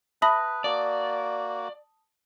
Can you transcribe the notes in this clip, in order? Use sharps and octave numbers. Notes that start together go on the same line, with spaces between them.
B4 E5 A5 B5 D#6 A#6
A#3 F#4 D5